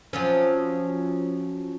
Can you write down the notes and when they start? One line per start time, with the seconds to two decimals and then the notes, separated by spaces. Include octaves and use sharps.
0.13 F3 F#3 C#4